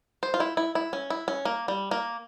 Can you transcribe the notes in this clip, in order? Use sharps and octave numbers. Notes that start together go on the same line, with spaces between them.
C5
F4
E4
E4
E4
C#4
E4
C#4
A#3
G3
A#3